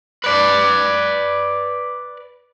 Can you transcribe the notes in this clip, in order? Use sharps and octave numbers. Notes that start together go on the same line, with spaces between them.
B4 D5